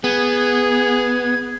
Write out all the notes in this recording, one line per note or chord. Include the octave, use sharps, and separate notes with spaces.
B3 G#4 G#6